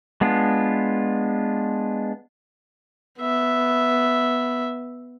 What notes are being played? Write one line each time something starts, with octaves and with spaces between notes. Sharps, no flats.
G#3 B3 D4 F4
B3 E5